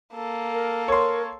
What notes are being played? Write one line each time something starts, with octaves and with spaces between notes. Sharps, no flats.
A#3 A4
A#4
A#4 C#5 C6